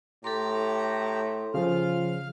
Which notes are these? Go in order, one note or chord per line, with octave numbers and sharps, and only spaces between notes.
A2 G4 A4 A#5 C6
C#3 F3 F4 F5 F6